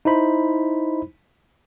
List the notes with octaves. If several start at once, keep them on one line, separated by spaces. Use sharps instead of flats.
D#4 E4 C5 B5